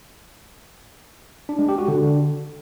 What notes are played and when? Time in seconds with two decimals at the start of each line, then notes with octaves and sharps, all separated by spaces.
1.49 D4
1.59 G#3
1.69 G4
1.78 F#4
1.88 D3